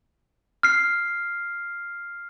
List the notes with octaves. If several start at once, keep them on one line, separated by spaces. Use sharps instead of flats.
F6 C7